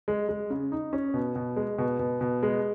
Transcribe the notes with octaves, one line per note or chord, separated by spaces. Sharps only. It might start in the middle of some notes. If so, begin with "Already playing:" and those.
G#3
G#3
C#3
D#4
C#4
B2
B2
G#3
B2
B2
B2
G#3